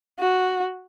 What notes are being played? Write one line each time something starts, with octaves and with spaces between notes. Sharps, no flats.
F#4